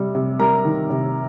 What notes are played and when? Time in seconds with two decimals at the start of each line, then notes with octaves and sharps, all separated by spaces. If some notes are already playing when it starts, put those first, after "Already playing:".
Already playing: C3 G3
0.15 C3
0.39 G3 A#4 A#5
0.65 D#3
0.90 C3